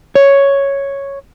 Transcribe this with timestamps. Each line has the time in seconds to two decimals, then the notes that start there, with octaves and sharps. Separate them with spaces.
0.15 C#5